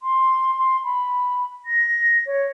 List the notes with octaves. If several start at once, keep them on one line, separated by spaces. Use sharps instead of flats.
C6
C6
B5
A#6
C#5